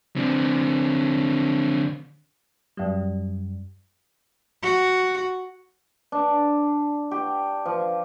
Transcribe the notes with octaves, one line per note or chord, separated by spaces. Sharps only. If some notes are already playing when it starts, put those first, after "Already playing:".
D3 C4
F#2 G3
F#4
D4
G4
F3